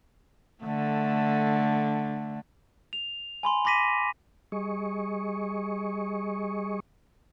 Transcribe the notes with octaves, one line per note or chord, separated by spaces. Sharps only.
D3 A3
F7
G#5 B5 C6
B5 C6 D6 A#6 B6 D#7
G3 G#4 D#5 C#6